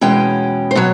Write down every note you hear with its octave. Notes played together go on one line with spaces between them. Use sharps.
E2 B2 G#3 C#4 G5
C5
B2 F#3 C#5